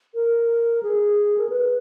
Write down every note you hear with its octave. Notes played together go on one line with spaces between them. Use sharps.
A#4
G#4
A#4
B4